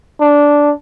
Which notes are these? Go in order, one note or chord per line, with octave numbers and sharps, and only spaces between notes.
D4